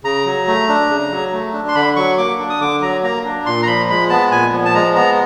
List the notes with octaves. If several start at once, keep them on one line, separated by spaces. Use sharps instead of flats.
C#3 A#5
F#3
A3
D4
C#3
F#3
A3
D4
C6
D3 B5
F#3 C#6
A#3 D6
D4
D#6
D3 D6
F#3 A#5
A#3 A#5
D4
A#2 C6
A#5
F3 B5
G#3 B5
B3 A5
A#2 G#5
F3
A5
G#3 A#5
B3 A#5